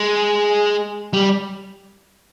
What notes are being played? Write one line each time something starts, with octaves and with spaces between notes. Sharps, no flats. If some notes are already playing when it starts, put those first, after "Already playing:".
Already playing: G#3
G3